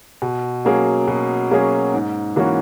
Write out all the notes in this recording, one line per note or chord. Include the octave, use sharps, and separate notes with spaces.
B2
F#3 A#3 C#4 G#4
B2
F#3 A#3 C#4 G#4
G#2
E3 A#3 C#4 F#4